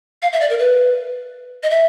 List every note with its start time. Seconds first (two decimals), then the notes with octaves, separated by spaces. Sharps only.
0.22 F5
0.33 E5
0.41 D5
0.50 A#4
0.59 B4
1.63 D#5
1.70 E5